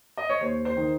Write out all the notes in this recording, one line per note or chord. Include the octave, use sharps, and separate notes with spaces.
D#5
C#5
D#2 C5
C5
D#3